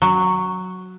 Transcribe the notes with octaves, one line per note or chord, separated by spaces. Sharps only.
F#3